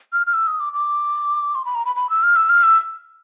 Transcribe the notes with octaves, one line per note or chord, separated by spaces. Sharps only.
F6
F6
E6
D#6
D6
D6
C6
B5
A#5
B5
B5
E6
F6
E6
F6
E6